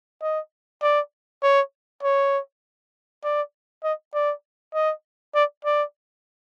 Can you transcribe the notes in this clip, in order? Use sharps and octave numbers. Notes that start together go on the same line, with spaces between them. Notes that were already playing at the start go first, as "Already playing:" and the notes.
D#5
D5
C#5
C#5
D5
D#5
D5
D#5
D5
D5